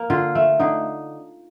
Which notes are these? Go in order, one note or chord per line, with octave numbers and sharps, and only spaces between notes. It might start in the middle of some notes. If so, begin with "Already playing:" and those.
Already playing: A#3
D3 F4
A3
D3 D#4